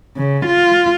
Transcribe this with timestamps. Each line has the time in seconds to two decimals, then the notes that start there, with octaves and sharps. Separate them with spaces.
0.16 C#3
0.46 F4